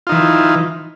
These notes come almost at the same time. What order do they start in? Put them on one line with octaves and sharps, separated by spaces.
F4 D#4 E3